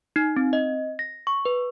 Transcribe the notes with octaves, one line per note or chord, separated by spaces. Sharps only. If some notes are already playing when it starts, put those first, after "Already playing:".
D#4
C4
D#5
A#6
C#6
B4